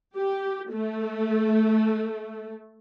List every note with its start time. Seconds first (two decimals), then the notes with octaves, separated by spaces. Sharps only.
0.16 G4
0.72 A3